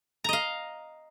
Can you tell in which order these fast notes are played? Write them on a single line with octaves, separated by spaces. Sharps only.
A#5 D#5 F5